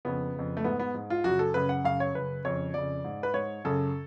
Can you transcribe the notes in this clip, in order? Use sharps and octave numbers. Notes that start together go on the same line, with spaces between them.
F2 C#3 B3
F2 C#3
A3
G#2 B3
B3
G#2
F4
F#2 C#3 F#4
A4
F#2 C#3 B4
F#5
F#2 C#3 F5
C#5
F#2 C#3 B4
F2 C#3 C#5
F2 C#3 D5
G#2
B4
G#2 C#5
F#2 C#3 A4